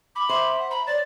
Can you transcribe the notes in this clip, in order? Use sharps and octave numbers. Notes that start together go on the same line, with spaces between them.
B5 D6
C5 E5 D6
F#5
A#5 B5
C#5 D5 A6